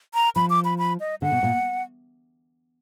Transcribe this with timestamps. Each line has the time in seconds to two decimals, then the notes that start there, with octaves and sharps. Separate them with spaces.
0.14 A#5
0.36 F3 B5
0.50 D6
0.64 B5
0.78 B5
1.00 D#5
1.22 D3 F#5
1.32 B2
1.43 A#2